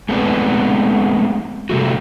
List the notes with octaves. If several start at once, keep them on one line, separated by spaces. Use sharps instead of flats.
G#3 A3 B3 C4 B4 D5
C3 G3 A3 F#4